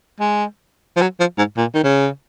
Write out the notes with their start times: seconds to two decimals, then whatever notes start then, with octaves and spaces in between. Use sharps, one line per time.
0.20 G#3
0.96 F3
1.02 F#3
1.20 F3
1.38 G#2
1.57 A#2
1.74 D#3
1.83 C#3